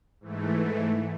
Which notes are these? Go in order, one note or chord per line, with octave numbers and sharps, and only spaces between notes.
G#2 E3 A3